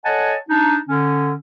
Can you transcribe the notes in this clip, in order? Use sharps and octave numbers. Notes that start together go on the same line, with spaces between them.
A4 C#5 D#5 F#5 G#5 A5
D4 D#4
D3 C#4